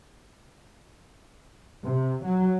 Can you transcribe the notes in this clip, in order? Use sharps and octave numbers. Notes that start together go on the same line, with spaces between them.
C3
F#3